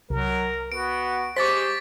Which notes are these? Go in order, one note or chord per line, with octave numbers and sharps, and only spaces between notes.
C2 F#3 A#4
B3 F#4 D7
G#3 G4 C5 C#6 D6 A6 B6